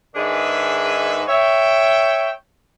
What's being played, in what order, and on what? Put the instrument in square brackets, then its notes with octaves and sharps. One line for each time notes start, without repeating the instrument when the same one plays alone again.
[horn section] G#2 D#3 D4 G#4 B4 E5
C#5 E5 G5